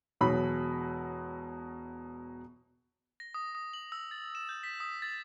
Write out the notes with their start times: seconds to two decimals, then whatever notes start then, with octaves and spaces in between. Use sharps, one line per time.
0.21 E1 B2 F#3 B5
3.20 A#6
3.34 D#6
3.55 D#6
3.73 F#7
3.92 E6
4.11 A6
4.35 E7
4.49 G6
4.63 B6
4.80 D#6
5.02 A6